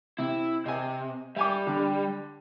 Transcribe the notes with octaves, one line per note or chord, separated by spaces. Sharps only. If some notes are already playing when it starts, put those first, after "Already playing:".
C3 E4
C3 D#5 G#5
G3 E5 G#5 D6
D3